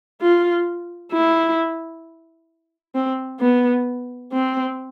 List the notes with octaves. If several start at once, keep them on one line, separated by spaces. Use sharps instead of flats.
F4
E4
C4
B3
C4